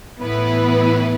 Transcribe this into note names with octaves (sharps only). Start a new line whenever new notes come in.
A2 E3 B3 E4 B4